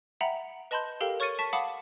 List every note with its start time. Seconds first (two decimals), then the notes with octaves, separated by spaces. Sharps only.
0.21 E5 F#5 G5 A#5 B5
0.71 B4 D#5 A5 B5 C6 G6
1.01 G4 A4 A#4 F5 G5
1.20 C#5 C#6 F6 A6 C#7 D#7
1.39 A5 C#6 B6
1.53 F5 F#5 A5 B5 D6 D#6